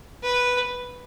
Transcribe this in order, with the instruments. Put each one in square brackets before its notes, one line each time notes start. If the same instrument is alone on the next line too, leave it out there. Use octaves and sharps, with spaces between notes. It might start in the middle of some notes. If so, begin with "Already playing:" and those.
[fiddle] B4